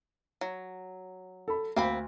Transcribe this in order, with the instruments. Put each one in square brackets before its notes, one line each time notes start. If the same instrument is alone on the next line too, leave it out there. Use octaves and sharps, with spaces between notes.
[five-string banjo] F#3
[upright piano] A4 B5
[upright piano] D2 [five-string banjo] A#3 C4 B5